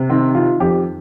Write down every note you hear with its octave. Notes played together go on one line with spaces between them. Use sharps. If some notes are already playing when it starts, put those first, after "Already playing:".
Already playing: C3
D#3 C4
D#3 F4
F2 G4